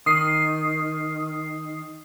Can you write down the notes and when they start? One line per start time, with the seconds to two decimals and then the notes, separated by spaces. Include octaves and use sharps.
0.06 D#3 D#6 C7